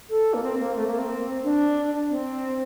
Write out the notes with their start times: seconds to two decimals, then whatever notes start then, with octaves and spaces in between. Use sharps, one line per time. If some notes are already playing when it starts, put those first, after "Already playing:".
0.10 A4
0.34 A#3
0.43 C4
0.60 A#3
0.76 A3
0.87 A#3
0.98 C4
1.44 D4
2.10 C4